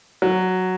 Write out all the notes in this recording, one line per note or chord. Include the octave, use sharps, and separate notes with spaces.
F#3